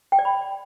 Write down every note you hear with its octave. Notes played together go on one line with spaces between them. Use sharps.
G5
D5
B5